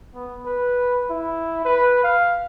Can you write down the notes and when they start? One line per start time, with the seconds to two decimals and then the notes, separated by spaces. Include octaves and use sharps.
0.14 B3
0.46 B4
1.10 E4
1.65 B4
2.04 F5